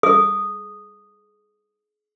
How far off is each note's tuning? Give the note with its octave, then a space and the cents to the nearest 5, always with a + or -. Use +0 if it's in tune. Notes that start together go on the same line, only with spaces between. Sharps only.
G#4 +25 D#6 -5